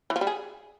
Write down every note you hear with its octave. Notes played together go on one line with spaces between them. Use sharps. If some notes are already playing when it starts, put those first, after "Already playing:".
E3
F3
G3
G#4